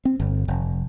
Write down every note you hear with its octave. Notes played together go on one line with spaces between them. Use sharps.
C4
G1
F1